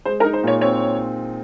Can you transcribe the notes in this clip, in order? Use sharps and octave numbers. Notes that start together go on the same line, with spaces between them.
G#3 C5
A#4
D#4
C5
A#2 C#5
C4 C#5